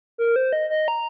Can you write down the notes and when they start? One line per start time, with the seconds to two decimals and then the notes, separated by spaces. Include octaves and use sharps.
0.18 A#4
0.36 C5
0.53 D#5
0.70 D#5
0.88 A#5